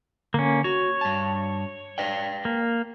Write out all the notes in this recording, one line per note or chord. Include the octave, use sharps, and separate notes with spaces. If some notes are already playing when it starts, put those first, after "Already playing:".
D3 A#3 C#4
F#4 C#5
G2 A5
B4 D5 G5
A#3